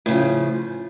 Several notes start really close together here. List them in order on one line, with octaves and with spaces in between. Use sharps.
A2 C#3 F3